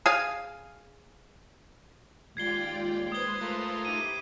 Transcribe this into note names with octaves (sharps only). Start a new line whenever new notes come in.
G#4 F5 G#5
D#2 G#3 F4 D5 G5 G#6 C7 G7
B4 C5 C6 D#6 G#6 G7
A3 F4 A#4
D#4 E4 G4 D6 D#7